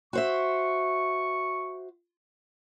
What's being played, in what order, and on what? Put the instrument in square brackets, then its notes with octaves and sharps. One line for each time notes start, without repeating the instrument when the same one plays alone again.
[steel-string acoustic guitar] F#4 C5 E5 [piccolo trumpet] C#6